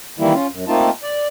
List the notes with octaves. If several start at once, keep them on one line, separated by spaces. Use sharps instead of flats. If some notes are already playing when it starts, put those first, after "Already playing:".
D#3 E3 G3 A#3 E4
C#4 F4
F#2
A3 A#3 C4 D#4 F4 A5
D5